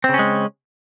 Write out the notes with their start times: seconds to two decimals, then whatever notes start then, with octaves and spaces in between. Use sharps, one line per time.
0.04 C4
0.09 C#3
0.14 C#4
0.19 G#3